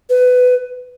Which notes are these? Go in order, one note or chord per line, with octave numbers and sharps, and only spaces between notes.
B4